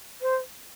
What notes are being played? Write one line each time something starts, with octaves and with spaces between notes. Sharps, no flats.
C5